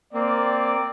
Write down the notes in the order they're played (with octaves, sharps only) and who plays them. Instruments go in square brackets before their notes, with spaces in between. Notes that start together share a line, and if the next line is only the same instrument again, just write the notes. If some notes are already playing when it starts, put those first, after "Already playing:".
[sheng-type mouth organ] A#3 C4 [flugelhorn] D5